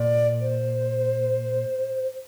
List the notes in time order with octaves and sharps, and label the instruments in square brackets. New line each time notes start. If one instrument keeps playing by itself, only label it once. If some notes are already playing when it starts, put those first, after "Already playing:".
Already playing: [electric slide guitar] A#2 [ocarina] D5
[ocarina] C5